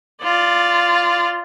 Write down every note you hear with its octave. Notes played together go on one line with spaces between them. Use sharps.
F4 D5